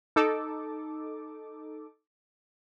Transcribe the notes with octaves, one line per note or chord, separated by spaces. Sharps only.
D#4 A4 D6